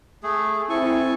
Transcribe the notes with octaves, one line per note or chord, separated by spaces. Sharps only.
A3 G#4
C4 E4 A4 G#5 C#6